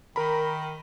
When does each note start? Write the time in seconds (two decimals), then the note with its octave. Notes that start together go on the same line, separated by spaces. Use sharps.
0.16 D#3 A#4 A#5 B5